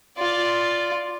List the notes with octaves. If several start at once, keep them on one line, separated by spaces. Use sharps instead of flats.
F4 D5